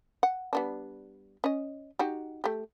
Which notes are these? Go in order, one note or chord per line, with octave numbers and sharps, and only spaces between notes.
F#5
G3 B3 D4
C#4 D#5
D#4 F#4 G4
A3 G4